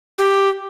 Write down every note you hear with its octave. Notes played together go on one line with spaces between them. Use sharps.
G4